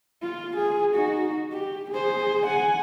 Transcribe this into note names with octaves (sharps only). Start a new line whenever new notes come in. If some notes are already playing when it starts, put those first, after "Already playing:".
F4
G#4
D#4 F#4
G4
G#4 C5
F#5 G#5